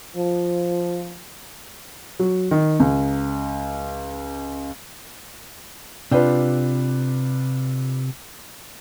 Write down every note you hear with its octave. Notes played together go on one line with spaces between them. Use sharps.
F3
F#3
D#3
C#2
C3 D4 F4 B4 G5